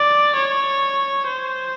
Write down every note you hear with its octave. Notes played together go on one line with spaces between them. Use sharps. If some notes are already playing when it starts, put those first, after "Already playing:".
Already playing: D5
C#5
C5